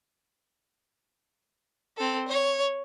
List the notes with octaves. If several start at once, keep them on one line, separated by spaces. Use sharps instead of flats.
C4 A4
C#5